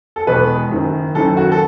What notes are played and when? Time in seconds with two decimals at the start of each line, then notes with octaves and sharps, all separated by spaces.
0.16 A4
0.27 E1 E2 B2 G#3 B4
0.71 F#1 F#2 D#3
1.15 F#1 F#2 D#3 A4
1.37 F#4
1.52 A4